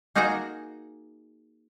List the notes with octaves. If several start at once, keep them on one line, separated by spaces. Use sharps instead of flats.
A#3 D#4 F#4 G#4 A#4 A#5